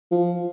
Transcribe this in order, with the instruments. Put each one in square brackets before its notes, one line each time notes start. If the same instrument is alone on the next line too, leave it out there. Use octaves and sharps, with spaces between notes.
[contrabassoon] F3